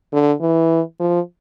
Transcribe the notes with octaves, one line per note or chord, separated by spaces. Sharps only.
D3
E3
F3